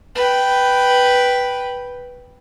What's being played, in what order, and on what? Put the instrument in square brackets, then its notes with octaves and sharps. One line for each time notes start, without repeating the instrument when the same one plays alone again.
[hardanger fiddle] B4 G5